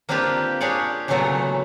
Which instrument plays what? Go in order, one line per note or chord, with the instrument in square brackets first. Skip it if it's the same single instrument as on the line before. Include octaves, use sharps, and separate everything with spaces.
[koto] A#3 C4 D4 F4 G4 B4
D4 G4 G#4 C#5 D5
A#2 C#3 E3 F#3 A3 B3